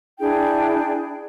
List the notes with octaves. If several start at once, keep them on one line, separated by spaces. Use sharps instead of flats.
D4 E4 G#4 G5